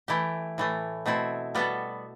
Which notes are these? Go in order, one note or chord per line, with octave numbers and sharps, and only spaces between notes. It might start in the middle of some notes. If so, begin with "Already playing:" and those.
E3 A3 E4 G4
A2 E3 A3
B2 A3 C4 E4
G3 B3 F#4 A4